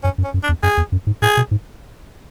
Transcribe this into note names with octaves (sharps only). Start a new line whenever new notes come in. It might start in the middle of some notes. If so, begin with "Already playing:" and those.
F#2 C#4
F#2
C#4
F#2
D4
E2
F#2 G#4
E2
F#2
G#2
A2 G#4
B2
G#2